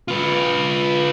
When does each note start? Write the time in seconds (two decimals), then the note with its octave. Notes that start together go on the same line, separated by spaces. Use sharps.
0.08 F4 B4